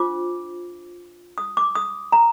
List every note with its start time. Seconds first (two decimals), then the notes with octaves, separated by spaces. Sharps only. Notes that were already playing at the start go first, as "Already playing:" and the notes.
Already playing: D4 F4 C5 D6
1.38 D#6
1.57 D6
1.75 D#6
2.12 A#5